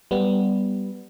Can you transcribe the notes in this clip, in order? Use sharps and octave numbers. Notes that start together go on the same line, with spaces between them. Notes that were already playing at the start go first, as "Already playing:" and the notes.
G3 B3